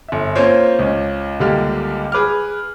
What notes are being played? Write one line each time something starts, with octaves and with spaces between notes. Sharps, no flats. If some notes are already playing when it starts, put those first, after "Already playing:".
G1 E5
A#3 C4 C#4 F4 C5 C#5
C#2 C#4
C#2 D3 G3 A#3 G4 F6
G#4 B4 D6 F6